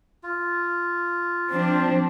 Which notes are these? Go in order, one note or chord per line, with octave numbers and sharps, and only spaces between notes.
F4
F3 C4 D4 C5